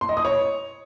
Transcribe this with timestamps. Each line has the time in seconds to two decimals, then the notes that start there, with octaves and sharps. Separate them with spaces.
0.01 C6
0.09 D#5
0.17 D#6
0.25 C#5